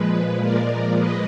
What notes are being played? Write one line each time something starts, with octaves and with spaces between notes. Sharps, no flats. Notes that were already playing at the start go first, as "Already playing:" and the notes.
Already playing: A#2 F3 G#3 B4
A#4 D5
B4 D#5